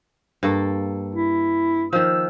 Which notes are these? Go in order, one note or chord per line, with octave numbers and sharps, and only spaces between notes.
G2 A#3 A4
E4
D#3 F3 E6